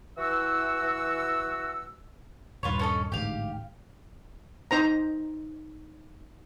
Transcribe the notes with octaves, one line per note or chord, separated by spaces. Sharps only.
E3 F#4 E6
D#1 G2 F4 B4 C#5
C#4 A4 D#5
A1 D2 G#2 G4 F5
D#4 C5 A#5